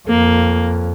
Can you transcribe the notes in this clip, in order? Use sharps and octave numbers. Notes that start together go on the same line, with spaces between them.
F2 A#3